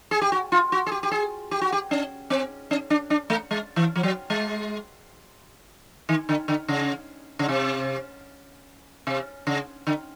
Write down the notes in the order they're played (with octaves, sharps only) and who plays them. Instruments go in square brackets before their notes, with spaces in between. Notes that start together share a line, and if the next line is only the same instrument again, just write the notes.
[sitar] G#4
G4
F#4
F4
F#4
G#4
G4
G4
G#4
G4
F#4
G4
C#4
C4
C#4
D4
D4
A3
G#3
E3
F3
F#3
G#3
D#3
D3
D3
C#3
C#3
C3
C3
C#3
D3